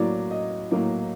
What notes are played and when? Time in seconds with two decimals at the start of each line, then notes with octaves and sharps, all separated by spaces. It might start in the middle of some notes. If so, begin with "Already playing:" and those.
Already playing: A2 F#3 A#3 D5
0.31 D#5
0.71 A2 F#3 A#3